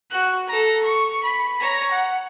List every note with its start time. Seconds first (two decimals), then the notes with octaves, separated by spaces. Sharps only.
0.10 F#4 F#6
0.47 A4 A#5
0.83 C#6
1.23 B5
1.60 C#5 A#5
1.91 F#5